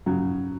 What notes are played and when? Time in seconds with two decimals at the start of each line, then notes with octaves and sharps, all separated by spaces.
0.06 C#3 F#3